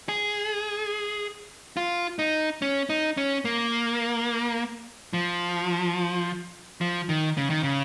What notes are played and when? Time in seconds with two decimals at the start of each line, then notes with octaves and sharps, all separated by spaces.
0.09 G#4
1.77 F4
2.19 D#4
2.62 C#4
2.90 D#4
3.17 C#4
3.45 A#3
5.13 F3
6.81 F3
7.09 D#3
7.37 C#3
7.50 D#3
7.63 C#3